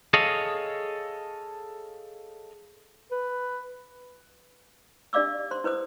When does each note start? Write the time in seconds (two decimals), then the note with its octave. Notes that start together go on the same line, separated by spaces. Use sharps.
0.14 G#4 A4 C#5 D#5 F5
3.11 B4
5.13 D4 G4 D5 F5 D6 E6
5.51 C5 C6
5.64 E4 B4 C5 D#6